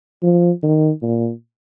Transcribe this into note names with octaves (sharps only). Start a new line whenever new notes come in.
F3
D#3
A#2